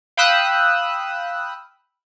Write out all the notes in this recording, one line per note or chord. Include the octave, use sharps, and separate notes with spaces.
F5 G5 B5 D#6 E6 F#6